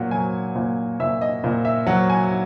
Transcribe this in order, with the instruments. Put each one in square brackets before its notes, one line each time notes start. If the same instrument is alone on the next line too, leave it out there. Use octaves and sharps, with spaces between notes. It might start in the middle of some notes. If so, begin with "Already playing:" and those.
Already playing: [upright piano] A#2 F#3 F#5
F#3 G#5
A#2
A#2 E5
D#5
A#2
E5
F#3 F#5
G#5